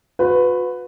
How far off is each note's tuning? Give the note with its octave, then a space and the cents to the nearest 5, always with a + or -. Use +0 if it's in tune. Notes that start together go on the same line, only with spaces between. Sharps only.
F#4 -40 B4 +15